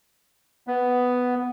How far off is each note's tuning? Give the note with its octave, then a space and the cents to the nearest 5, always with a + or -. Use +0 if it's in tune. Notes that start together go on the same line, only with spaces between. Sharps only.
B3 +5